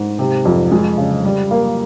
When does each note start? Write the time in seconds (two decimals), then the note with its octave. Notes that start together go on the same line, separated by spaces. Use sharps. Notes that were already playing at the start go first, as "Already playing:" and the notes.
Already playing: G#2
0.19 C3
0.45 F2
0.72 G#3
0.98 C#3
1.25 G3
1.51 A#3